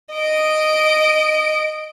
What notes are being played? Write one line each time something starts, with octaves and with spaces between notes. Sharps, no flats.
D#5 D7